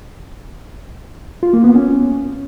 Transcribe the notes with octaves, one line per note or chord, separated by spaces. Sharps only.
F4
A#3
B3
C#4